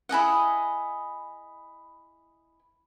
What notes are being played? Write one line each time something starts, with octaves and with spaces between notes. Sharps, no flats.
E4 G#4 D#5 F#5